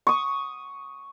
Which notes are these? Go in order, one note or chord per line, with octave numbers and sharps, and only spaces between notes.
C#6 D#6